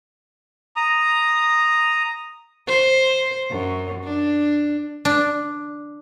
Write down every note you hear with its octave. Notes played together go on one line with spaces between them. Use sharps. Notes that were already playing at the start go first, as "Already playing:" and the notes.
A#5 D#6
C5
F#2
D4
D4